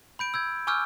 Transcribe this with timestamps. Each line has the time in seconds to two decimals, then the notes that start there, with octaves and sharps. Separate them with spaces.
0.19 B5 G6 D7
0.34 E6 G6 G#6
0.67 G#5 C#6 D6 E6 F6 G6